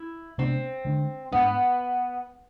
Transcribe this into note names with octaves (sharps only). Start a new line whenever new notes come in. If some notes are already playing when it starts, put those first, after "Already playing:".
Already playing: E4
C3 G#3 B3 C4 D4
D3 G#3 D4
G#2 G#3 B3 D4